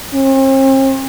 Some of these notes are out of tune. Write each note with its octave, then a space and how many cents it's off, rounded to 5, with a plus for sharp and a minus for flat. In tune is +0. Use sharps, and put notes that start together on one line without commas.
C4 +45